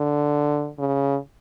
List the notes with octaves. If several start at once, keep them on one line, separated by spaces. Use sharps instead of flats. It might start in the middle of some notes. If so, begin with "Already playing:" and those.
Already playing: D3
C#3